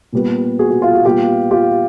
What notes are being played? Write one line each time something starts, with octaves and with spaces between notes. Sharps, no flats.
A#2 G3 B3
F#4 G#4
F#4
F4
F#4
A#2 G3 B3 F4 G4
F4 G4